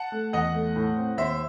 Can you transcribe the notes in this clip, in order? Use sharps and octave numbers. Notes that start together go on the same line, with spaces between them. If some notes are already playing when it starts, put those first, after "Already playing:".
Already playing: F#5 A5
A3
E2 D#5 F#5
A3
A2
C4
D#2 C5 E5